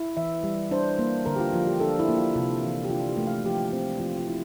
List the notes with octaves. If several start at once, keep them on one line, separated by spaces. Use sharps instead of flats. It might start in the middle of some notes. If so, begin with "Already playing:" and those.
Already playing: E4
E3 E5
G3
D4 C5
A#3
D3 A#4
G4
F4
F3 F4
G4
D4 A4
E4
A#3
F4
C3 F4
E3
G4
D4 F4
G4
A3
F5
F3 G4
C4
F3 F4
F4
E4